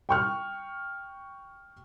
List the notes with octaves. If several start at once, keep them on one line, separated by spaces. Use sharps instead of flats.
G5 C#6 F6